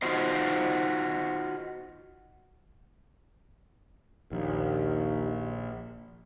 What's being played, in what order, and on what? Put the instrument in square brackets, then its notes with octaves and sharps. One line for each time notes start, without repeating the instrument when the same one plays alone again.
[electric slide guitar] D#4 F4 F#4 C5 D#5
[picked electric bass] A#1 [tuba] D#2